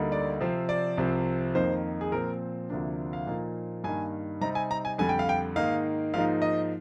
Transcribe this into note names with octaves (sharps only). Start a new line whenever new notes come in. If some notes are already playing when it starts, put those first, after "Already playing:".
Already playing: D2 D3 G3 A#3 D#4
D5
C3 F3 C4
D5
C2 C3 F3 C4
F2 D#3 A#3 D#4 C5
G#4
A#2 F3 C4 A#4
D2 C3 F3 A#3 D4
F5
A#2 F3 A#3 D#4
G2 D#3 A#3 D#4 G#5
C3 G3 C4 D#4 A#5
G#5
A#5
G#5
F2 D3 G3 G#5
G5
F5
G5
G#2 D#3 A#3 D#4 F5
G#2 F3 A#3 D#4 F5
D#5